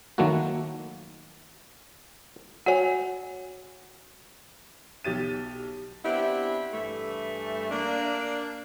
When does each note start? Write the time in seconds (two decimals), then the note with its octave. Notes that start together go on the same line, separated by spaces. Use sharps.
0.18 D#3 F#3 A3 A#3 E4 F#4
2.66 F#4 C#5 F#5 G#5
5.04 B1 G4 A6 D#7
6.05 B3 C4 D4 E4 G4
6.73 G2 E3 A3
7.71 A#3 D4